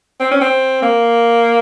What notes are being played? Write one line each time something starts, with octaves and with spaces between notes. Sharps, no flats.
C4
C#4
C4
A#3